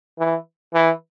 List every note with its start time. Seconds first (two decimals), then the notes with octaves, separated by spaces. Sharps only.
0.19 E3
0.74 E3